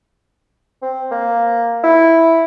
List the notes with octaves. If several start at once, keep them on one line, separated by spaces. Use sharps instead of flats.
C4
A#3
E4